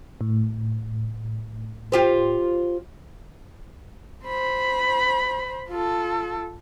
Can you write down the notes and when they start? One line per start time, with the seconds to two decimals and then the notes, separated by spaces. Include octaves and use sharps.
0.21 A2
1.92 F4 G4 C5
4.25 C5 B5
5.69 F4 A4